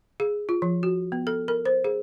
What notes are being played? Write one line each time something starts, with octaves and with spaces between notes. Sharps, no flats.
G#4
F4
F3
F#4
B3
A4
A#4
C5
G#4